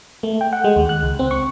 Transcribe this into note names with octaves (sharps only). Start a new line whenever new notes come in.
A3
G5
F#5
G#3
D#2
F#6
C#2
C4
C#6